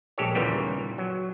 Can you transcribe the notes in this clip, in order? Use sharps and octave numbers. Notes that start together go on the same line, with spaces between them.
A#1 G#3 G4 A4 C#5
D#2 A#2 C#3 E3 G3 B3
F#3